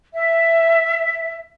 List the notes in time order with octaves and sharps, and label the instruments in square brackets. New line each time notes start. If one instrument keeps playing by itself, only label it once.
[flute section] E5